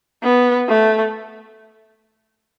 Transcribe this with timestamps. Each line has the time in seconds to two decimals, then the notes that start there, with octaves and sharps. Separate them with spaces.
0.23 B3
0.69 A3